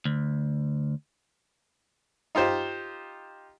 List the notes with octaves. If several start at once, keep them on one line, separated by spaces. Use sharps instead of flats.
D2
D#4 F4 G4 C5